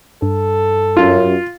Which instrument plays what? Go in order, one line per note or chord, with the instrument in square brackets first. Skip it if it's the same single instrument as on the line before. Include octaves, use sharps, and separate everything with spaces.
[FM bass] G2 [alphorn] A4
[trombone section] F#2 [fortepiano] F4